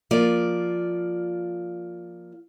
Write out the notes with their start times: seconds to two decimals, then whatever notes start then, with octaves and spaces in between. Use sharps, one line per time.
0.11 F3 A#3 F4 D5